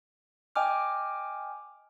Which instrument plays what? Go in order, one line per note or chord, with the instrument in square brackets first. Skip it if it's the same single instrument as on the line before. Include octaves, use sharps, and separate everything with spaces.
[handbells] D#5 G5 G#5 D6 F6